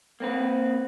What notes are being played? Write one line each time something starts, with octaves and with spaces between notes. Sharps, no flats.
A#3 C4 B4